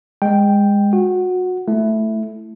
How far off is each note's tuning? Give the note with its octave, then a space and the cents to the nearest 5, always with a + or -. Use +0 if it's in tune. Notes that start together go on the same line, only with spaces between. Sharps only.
G#3 -25 G5 +0
F#4 -25 F#5 +0
A3 -5 E4 +5